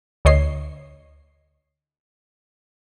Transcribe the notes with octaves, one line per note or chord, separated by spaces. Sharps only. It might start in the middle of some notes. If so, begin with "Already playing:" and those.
D2 D3 C#5 D#5 C7